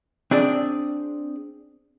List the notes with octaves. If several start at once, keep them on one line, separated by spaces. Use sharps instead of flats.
C4 D4 G#4 D5